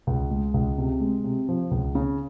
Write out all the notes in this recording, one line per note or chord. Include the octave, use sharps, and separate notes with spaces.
C#2
G#3
C#2
C3
G#3
C3
F3
C#2
C#3